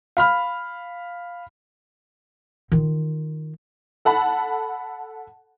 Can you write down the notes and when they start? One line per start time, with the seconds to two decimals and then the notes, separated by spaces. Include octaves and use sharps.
0.17 F5 B5 F6
2.72 D#3 F4
4.05 A4 F#5 A5 B5